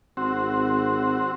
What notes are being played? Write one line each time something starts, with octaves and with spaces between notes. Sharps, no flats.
G#1 C4 F#4